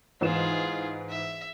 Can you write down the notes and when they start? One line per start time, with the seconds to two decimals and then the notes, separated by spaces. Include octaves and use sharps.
0.21 G#2 E3 F4 G#4 E7
1.10 E5